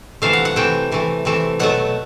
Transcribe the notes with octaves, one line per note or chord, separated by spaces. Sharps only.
C3 E3 A3 F5
F#5
F#5
C3 E3 A3 G5
C3 E3 A3
C3 E3 A3
B2 F#3 A3 F#5